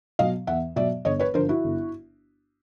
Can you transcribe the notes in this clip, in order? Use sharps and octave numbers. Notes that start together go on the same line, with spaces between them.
B2 F#3 D#5 F5
E2 E5 F#5
B2 F#3 D5 E5
G1 C#5 D#5
B4 C#5
G2 D3 F3 A#4 C5
E4 F#4
G1